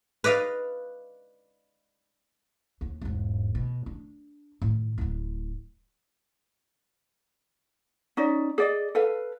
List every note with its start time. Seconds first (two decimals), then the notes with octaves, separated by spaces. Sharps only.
0.24 B4 D5 D#5 F5
2.81 D#2
3.01 E1 G#2
3.55 B2
3.86 D4
4.62 A2 D#3
4.98 D1 E4
8.17 C#4 D#4 D5
8.58 G#4 D5 D#5
8.95 A4 B4 F5